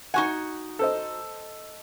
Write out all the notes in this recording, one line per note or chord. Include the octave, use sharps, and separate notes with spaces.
D#4 F#4 F#5 G#5 C#6
A4 C5 D#5